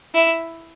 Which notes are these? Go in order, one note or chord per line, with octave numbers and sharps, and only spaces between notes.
E4